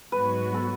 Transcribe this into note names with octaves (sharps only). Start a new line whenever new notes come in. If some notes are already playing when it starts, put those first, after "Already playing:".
G#2 F#3 B3 F#4 B4
A4